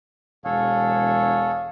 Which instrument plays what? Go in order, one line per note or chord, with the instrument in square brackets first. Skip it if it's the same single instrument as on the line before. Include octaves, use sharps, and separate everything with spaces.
[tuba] E1 [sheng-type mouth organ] G#4 A4 C#5 [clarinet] F5